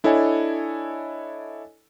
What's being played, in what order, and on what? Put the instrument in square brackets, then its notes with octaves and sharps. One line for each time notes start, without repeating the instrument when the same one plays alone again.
[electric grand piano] D4 E4 A4 C#5 D#5 G#5